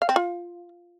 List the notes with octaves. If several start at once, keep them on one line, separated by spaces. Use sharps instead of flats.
F5
C4
F4